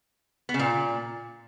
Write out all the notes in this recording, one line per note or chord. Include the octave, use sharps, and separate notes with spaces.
B3
C#3
A#2